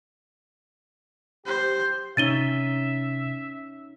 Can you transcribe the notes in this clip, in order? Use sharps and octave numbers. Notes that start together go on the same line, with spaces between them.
G4 C5
C3 C#4 D#4 E5 A6 D#7 G7